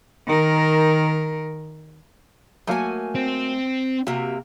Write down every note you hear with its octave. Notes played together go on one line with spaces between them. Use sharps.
D#3 A#4
F#3 A3 A#3 F#4 G#5
C4
C3 A#3 F#4